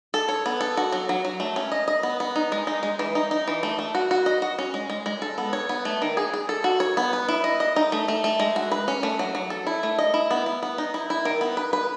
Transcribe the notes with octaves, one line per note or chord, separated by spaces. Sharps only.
A4
C#5
B3
A4
F#4
F#3
F#3
F#3
A3
C#4
D#5
D#5
B3
B3
D#4
G#3
D#4
G#3
E3
D#4
D#4
E3
A3
A3
F#4
F#4
D#5
F#4
C#4
G#3
G#3
G#3
A4
B3
C#5
B3
A3
D#3
G#4
G#4
A4
F#4
C#5
B3
B4
E4
D#5
D#5
D#4
A3
A3
A3
G#3
F#4
B4
C#4
A3
F#3
F#3
A4
E4
A3
D#5
E4
B3
B3
B3
D#4
E4
E4
D#3
B3
B4
B4